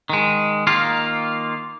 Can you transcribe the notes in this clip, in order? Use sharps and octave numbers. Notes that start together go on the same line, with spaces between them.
D#3 G#3
D#3 A#3 F4